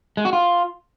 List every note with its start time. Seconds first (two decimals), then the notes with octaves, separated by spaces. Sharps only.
0.17 G#3
0.25 F#4
0.33 F4